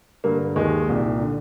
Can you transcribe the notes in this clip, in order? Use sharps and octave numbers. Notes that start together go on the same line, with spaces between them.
G2 D3 A#3
D#2 D#3 G#3
C2 A#2
D3